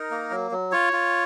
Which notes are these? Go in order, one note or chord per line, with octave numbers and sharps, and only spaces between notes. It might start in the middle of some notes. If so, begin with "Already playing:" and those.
Already playing: D#4 A#4
A#3
F#3
F#3
F4 C#5
F4